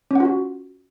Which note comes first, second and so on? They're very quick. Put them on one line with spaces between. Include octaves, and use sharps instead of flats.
C#4 F#5 F4 F#4